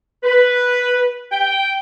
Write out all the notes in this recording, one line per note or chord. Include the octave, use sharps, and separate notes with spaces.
B4
G5